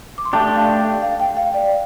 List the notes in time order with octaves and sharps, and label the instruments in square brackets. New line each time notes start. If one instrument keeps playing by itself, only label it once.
[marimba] D6
C6
[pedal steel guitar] A3 D4 G4 [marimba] A5
[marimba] F5
F5
G5
F5
D5